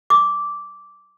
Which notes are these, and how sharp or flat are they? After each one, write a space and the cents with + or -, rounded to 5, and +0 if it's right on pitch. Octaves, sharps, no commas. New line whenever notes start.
D6 -10